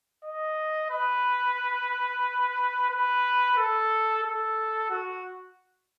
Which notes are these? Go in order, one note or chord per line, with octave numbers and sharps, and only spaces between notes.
D#5
B4
B4
A4
A4
F#4